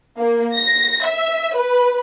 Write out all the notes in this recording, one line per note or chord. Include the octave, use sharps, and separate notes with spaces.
A#3
A#6
E5
B4